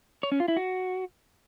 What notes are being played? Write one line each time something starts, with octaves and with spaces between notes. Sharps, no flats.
C#5
C#4
F4
E4
F#4